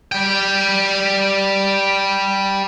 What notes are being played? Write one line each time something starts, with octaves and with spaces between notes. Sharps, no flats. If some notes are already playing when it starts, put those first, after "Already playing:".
G3 G5